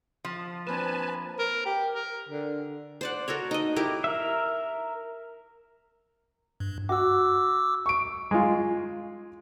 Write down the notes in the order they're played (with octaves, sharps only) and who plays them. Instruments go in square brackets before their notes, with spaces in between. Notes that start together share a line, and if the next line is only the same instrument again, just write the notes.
[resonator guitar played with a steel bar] F3
[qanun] A#3 C4 D4 [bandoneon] B4 [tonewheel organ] G#5 A5
[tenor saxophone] A#4
G4
A#4
D3
[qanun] C5 D5 F#5
F#4 A4 A#4 C#5
D#4 D#5
E4 G4 A#4
[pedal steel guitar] A#4 E5
[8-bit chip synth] G2
[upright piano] F#4 [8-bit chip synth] D6 E6
[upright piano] C#6 D7
[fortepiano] G#3 F4